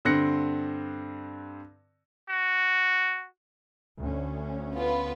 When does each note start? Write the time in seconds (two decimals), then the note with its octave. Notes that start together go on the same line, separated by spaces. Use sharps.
0.05 G2 D3 C4 F#6 A#6 C#7
2.29 F#4
4.00 D2 C#4
4.75 B3 F4 B4